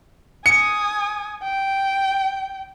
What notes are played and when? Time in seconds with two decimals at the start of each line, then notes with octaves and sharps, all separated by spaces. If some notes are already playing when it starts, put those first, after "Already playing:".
0.46 G#5 D#6 C#7
1.43 G5